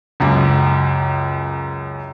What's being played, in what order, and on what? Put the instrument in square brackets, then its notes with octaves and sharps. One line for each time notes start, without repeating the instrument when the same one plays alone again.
[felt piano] C#2 F#2 D6